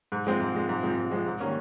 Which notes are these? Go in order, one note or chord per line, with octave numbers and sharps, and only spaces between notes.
G#2
F3 G#3 C4
G#2
F3 G#3 C4
G#2
F3 G#3 C4
G#2
F3 G#3 C4
G#2
D#3 G3 A#3 C#4